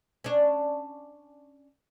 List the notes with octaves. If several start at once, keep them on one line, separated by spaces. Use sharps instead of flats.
C#4 D4